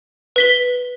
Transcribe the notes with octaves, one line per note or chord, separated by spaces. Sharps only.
B4 B6 G7